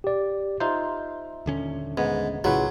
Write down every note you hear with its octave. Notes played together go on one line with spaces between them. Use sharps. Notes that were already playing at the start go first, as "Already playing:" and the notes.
G4 D5
D#4 F4 C5 E5
D#1 D3 C#4
G#2 B3
B1 A2 C#3 F#3 E4 F4 G#4 B4